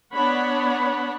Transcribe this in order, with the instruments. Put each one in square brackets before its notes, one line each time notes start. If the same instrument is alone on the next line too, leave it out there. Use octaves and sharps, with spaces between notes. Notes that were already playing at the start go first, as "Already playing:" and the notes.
[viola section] B3 D4 C#5 F#5 B5